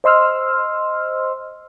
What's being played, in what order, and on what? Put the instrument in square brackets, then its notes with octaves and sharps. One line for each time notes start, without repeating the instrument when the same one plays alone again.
[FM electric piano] C5 D#5 C6 E6 F6